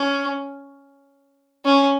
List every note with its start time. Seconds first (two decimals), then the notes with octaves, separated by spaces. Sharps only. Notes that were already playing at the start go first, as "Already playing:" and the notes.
Already playing: C#4
1.65 C#4